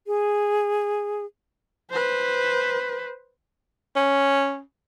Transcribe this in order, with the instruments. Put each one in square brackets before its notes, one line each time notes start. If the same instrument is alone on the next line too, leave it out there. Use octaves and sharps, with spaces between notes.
[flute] G#4
[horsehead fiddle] B4 C5
[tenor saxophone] C#4